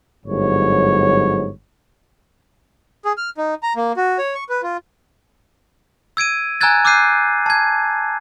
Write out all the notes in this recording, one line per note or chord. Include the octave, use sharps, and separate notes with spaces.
G1 G#2 F#3 C#5
G#4
F6
D#4
A#5
A#3
F#4
C#5
C#6
B4
F4
E6 G#6 D7 D#7
G#5 A#5 E6 F#6 G#6 A6
D6 E6 F#6 G6 C7 D#7
A5 G#6